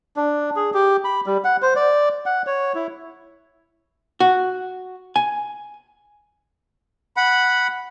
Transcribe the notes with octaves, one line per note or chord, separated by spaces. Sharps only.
D4
G#4
G4
B5
G3
F#5
C5
D5
F#5
C#5
E4
F#4
G#5
F#5 B5